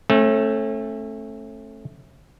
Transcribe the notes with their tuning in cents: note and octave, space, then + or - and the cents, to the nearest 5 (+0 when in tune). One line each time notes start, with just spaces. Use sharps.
A3 +0 C#4 -40